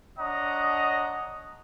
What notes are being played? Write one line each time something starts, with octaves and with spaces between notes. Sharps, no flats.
D4 C#5 D#5 F#5 A#5 D#6